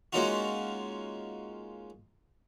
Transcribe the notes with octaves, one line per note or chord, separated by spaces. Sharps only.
G#3 A#3 C#4 D#4 F4 F#4